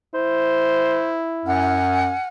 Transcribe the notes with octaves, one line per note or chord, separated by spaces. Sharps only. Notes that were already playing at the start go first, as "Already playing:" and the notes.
E4 C5
F#2 F#5 G#5 F6